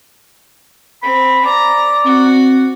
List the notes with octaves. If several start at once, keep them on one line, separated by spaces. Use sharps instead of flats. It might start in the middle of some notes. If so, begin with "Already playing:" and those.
C4 B5
D5 A#5
C4 F#4